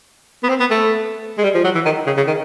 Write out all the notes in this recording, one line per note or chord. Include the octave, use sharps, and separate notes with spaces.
B3
C4
B3
A3
G#3
G3
F3
F#3
E3
D#3
C#3
C#3
D#3